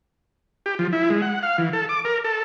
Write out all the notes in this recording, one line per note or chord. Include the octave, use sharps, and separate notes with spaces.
G4
F3
E4
G#3
F#5
F5
E3
A4
D6
A#4
A4